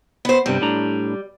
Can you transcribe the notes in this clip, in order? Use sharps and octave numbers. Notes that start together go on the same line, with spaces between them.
B3 C5
G2 C3 G3 C4
A2 D4 A#5